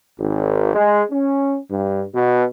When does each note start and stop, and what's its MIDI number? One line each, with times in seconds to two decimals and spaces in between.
0.19 0.73 32
0.74 1.03 56
1.12 1.58 61
1.70 2.05 43
2.15 2.45 47